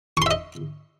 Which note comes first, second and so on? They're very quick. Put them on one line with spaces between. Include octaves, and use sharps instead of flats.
C#6 C6 E5 D#5